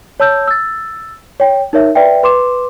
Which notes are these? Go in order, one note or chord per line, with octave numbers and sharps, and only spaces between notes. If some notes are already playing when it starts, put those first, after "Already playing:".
C#5 A5 E6 G6
E6 A6
C#5 G5
D#4 A#4 C#5 E5
B4 D5 E5 G5
B4 C6 D6 E7